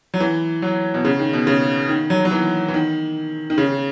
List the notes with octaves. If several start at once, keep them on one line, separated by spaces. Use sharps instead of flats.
F#3
E3
F#3
B2
C#3
D#3
B2
C#3
D#3
F#3
F#3
E3
E3
D#3
D#3
C#3